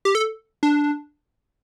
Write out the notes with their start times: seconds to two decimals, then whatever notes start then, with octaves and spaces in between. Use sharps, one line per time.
0.05 G4
0.15 A4
0.63 D4